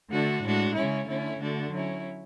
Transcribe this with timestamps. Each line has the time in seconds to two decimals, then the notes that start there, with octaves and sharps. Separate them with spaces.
0.10 D3 A3 D4 F#4
0.42 A2 G#3 D4 F#4
0.74 C#3 G#3 C#4 E4
1.06 D3 A3 C#4 E4
1.39 D3 A3 D4 F#4
1.71 F#3 C#4 E4